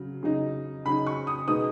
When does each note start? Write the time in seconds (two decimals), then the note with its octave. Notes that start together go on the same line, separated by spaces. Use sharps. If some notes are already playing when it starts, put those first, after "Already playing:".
Already playing: C#3 F#3
0.23 C#3 F#3 D#4
0.85 C#3 F#3 D#4 B5
1.07 C#6
1.27 D#6
1.47 B2 G#3 B3 D#4 D#6